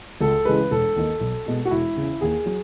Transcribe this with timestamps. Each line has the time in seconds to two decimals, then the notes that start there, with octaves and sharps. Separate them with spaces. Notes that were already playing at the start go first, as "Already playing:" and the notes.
0.21 C#2 A4
0.45 C#3 E3 G#3 B4
0.71 E1 A4
0.96 D#2 D#3
1.20 B1
1.46 B2 G#3
1.65 F#4
1.71 E1 E4
1.96 E2 C#3
2.21 D#2 G#4
2.46 F#3